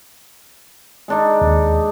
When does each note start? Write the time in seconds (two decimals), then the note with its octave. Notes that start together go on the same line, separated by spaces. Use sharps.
1.08 G#3 D4 D#4
1.41 D#2